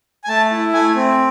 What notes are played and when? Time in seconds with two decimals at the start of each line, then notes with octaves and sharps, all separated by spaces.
0.24 G#5
0.28 A3 A5
0.51 E4
0.74 A3 G#5
0.96 C4